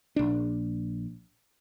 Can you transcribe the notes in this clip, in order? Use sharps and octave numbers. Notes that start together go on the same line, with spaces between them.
A#1 D4